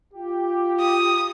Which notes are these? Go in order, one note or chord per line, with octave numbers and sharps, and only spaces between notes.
F4 G4
D#6